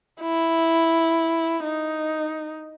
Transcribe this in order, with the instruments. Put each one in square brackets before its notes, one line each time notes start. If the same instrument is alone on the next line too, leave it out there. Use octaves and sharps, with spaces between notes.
[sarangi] E4
D#4